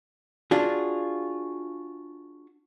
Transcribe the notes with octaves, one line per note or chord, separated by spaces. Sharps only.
D4 F4 F#4 G#4